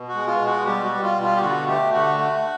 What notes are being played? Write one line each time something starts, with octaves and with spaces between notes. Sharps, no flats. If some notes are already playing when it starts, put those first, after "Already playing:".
Already playing: B2
F#4
G#3
F4
B2
F#4
G3 G4
F#4
G3
F4
B2
F4
G4
D3 F#4
A3 G4
D3 F#4
A3